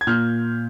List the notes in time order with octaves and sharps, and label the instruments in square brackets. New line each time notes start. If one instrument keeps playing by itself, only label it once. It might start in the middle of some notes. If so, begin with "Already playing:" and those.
[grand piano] G#6
A#2 F6 G6